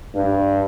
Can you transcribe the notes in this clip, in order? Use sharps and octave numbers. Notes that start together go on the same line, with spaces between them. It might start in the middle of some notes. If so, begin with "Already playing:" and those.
G2